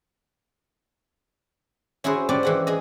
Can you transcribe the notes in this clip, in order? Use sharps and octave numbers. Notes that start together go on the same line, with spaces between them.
C#4 E4 F#4 G#4 C5
C#4 D4 G4 C5 D5
E3 G#3 F#5
G#4 D#5